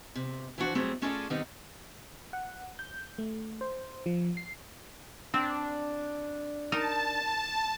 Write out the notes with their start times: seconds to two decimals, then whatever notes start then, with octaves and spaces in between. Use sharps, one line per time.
0.16 C3
0.58 E3 F3 D4 F#4 C5
0.75 F#3 G3 A3 C4 G#4
1.02 A3 C#4 F4 G#4 A4 D5
1.30 D#3 G3 B3 C4 D#4
2.33 F#5
2.79 G6
3.18 A3
3.61 C5
4.06 F3
4.37 C7
5.34 C4 D4
6.72 D#4 A#4 A5